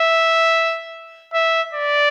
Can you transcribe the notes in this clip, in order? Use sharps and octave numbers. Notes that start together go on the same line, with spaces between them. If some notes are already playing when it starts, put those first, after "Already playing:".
Already playing: E5
E5
D5